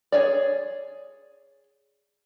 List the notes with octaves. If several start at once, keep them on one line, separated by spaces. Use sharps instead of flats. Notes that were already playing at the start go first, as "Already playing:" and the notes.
G#4 C#5 D5